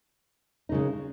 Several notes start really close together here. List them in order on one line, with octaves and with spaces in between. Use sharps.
D#4 C#3 G#3